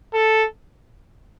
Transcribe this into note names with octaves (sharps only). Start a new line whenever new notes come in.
A4